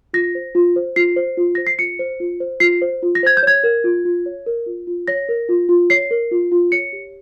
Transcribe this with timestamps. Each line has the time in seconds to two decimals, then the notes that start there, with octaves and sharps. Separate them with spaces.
0.13 F4 A#6
0.35 C5
0.55 F4
0.76 C5
0.96 F4 C7
1.16 C5
1.37 F4
1.55 C5 A#6
1.67 C7
1.78 F4 C#7
1.99 C5
2.20 F4
2.40 C5
2.60 F4 C7
2.81 C5
3.02 F4
3.15 A#6
3.23 C5 G#6
3.37 G6
3.43 C#5 G#6
3.64 A#4
3.84 F4
4.05 F4
4.26 C#5
4.46 A#4
4.66 F4
4.87 F4
5.08 C#5 A#6
5.29 A#4
5.49 F4
5.69 F4
5.90 C#5 C7
6.11 A#4
6.31 F4
6.52 F4
6.72 C#5 C#7
6.93 G4